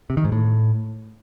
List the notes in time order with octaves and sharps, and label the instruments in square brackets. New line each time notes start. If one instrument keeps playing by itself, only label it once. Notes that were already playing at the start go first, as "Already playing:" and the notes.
[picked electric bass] C3
D#3
G#2
A2